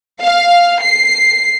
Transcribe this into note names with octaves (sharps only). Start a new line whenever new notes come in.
F5
C7